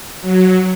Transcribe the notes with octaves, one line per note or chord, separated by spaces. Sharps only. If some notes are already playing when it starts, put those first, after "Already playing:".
F#3